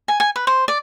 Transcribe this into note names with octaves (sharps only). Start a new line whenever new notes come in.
G#5
G#5
B4
C5
D5